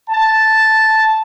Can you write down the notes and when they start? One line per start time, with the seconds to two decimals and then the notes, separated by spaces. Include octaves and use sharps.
0.10 A5